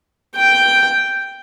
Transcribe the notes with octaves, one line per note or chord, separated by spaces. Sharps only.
G5